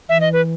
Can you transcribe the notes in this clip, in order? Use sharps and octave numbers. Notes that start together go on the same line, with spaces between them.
E3 E5
D#5
B4